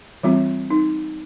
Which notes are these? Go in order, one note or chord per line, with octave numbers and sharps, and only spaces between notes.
E3 G3 C4 F4
D#4